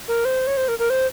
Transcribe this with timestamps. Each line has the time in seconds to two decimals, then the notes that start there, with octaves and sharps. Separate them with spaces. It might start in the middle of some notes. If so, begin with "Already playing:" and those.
0.08 A#4
0.25 C5
0.47 C#5
0.57 C5
0.68 A#4
0.79 A#4
0.90 C5